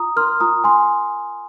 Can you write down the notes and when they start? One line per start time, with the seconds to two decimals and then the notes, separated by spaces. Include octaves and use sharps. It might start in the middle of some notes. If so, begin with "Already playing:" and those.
Already playing: F4 A#5 D#6
0.16 A#4 C6 F6
0.40 F4 A#5 D#6
0.64 G#5 C6